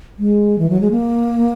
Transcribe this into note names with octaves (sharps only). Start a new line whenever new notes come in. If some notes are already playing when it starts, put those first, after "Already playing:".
G#3
E3
F#3
G#3
A#3